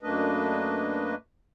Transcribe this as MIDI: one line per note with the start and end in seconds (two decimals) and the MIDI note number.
0.02 1.15 42
0.02 1.15 57
0.02 1.15 58
0.02 1.15 62
0.02 1.15 71
0.02 1.15 75